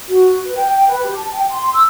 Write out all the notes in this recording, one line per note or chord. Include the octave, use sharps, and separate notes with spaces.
F#4
B4
G5
B4
G4
A5
G5
C6
E6